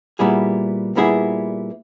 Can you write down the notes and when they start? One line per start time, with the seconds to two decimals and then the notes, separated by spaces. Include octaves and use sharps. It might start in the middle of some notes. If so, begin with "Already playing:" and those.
0.19 A#2 G3 B3 E4 G#4
0.96 A#2 G3 B3 E4 G#4